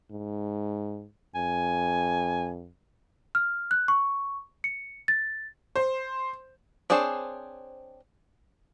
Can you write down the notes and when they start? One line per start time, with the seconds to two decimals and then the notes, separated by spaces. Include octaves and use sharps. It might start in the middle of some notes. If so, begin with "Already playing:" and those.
0.11 G#2
1.35 F2 G#5
3.35 F6
3.71 F#6
3.88 C#6
4.64 C#7
5.08 A6
5.76 C5
6.90 C4 D4 G#4 C5 C#5